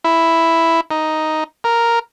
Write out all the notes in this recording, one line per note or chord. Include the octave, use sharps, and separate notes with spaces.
E4
D#4
A#4